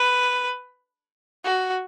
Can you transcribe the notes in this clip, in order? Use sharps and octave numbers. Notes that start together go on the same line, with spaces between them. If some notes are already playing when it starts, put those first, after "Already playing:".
Already playing: B4
F#4